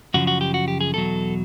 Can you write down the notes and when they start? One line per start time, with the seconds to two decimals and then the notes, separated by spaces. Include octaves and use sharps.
0.14 F#2 C#3 F3 F#4
0.27 F#4
0.41 G4
0.54 F#4
0.68 G4
0.81 G#4
0.94 E2 B2 F#3 A4